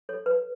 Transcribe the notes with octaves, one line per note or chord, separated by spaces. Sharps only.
A4 C#5
B4